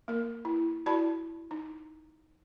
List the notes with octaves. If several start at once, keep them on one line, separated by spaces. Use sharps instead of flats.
A#3 A#4
E4
E4 F#4 D5 A5 B5
D#4